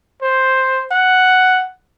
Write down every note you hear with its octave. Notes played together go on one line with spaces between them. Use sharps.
C5
F#5